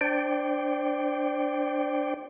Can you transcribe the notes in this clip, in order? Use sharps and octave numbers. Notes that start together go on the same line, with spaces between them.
D4 C5 D5 G5